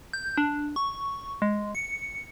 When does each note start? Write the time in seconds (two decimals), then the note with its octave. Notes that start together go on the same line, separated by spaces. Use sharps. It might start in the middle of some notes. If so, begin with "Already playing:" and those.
0.13 G6
0.37 D4
0.76 C#6
1.42 G#3
1.75 C#7